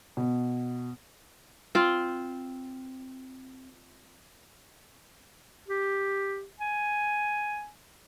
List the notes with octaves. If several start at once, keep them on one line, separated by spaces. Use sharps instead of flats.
B2
C4 F4
G4
G#5